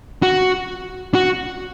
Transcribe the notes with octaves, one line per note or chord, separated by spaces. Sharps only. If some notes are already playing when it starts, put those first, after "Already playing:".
F#4
F#4